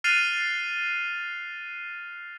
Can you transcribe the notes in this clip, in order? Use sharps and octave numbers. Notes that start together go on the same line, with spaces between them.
F6 F#6 A6 C7 D#7 F7